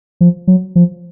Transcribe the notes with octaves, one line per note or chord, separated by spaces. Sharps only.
F3
F#3
F3